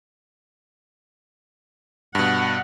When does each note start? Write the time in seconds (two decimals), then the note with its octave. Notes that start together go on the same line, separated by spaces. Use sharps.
2.15 G2 B2 F#5